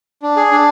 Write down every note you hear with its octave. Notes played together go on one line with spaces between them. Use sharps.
D4
G#4
D4